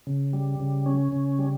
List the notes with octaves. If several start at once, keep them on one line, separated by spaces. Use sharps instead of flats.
C#3
G3
C#3
C#4
C#3
G3